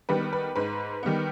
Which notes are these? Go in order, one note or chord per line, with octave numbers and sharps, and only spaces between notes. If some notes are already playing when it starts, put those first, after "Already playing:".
D#3 G3 B3 B4
B4
G#2 B4
D#3 G3 B3